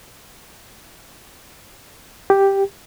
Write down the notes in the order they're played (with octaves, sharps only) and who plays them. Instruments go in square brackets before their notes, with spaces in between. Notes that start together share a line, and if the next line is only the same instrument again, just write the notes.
[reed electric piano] G4